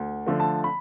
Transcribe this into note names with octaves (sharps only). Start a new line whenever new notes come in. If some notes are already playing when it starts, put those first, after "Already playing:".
Already playing: D2
D3 F3 A3
A5
B5